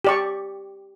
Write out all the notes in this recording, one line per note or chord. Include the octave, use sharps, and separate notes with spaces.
G4 D5 C#6